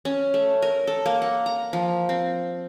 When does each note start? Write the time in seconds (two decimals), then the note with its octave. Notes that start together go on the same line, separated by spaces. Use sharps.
0.05 C#4
0.34 A3
0.62 A#4
0.87 A4
1.06 A#3
1.22 F#5
1.46 A#5
1.73 F3
2.09 C4